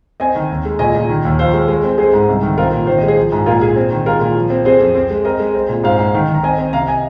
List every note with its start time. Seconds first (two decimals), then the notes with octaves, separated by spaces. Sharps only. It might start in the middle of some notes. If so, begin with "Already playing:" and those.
0.20 C4 D#5 G#5
0.35 D#3
0.51 D#2
0.65 G#3
0.79 A#2 D#5 G#5
0.95 A#2
1.09 D#3
1.25 D#2
1.39 F3 C5 F5
1.53 G#3
1.68 G#3
1.84 C4
1.98 G#3 G#4 C5
2.13 G#2
2.28 C2
2.43 D#3
2.58 C4 F4 A#4
2.72 A#2
2.87 D#3 C5
2.98 G#3 D#5
3.08 G#4 C5
3.17 F3
3.32 G#2
3.46 A#2 F4 A#4
3.61 A#2 G#4
3.76 C4
3.91 D#3
4.06 G#3 F4 A#4
4.21 A#2
4.35 F3
4.50 C4
4.65 C4 G#4 C5
4.80 F2
4.95 C4
5.10 G#3
5.24 C4 A#4 D#5
5.39 G#3
5.55 C4
5.69 A#2
5.84 G#2 C5 F5
5.99 G#2
6.14 D#3
6.29 D#3
6.35 A#5
6.43 C4 D#5 G#5
6.58 C4
6.73 C3 F5 A#5
6.88 D#5 G#5